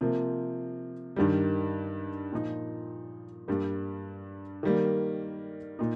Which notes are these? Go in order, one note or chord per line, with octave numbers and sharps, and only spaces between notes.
C3 F3 A#3
G2 D#3 G3
A#2 F3 D#4
G2 G3 A#3
D#3 G3 A#3
A#2 D#4